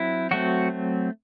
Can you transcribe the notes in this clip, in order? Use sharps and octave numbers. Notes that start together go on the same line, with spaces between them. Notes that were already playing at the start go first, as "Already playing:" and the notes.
Already playing: F#3 C4 E4
F#3 A3 C4 F#4